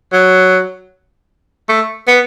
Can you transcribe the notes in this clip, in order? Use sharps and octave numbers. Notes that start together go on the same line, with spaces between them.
F#3
A3
B3